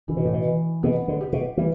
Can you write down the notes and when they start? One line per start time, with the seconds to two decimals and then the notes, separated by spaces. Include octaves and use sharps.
0.08 D3 E3
0.17 B2
0.25 A2
0.33 B2
0.45 E3
0.83 B2 B3
1.08 D3
1.21 G4
1.33 B2
1.57 E3 G3